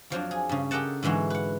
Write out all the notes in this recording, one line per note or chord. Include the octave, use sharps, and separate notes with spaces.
F2 F3 F#3 D4
G#4
G2 C#3
G4 A4 A#4 D#5 F#5 A5
G#2 D3 E3 G#3 F#4
B4 F#5